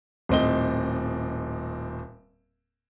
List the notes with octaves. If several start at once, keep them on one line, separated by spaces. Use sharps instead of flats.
D#1 A2 C4 D#5 G7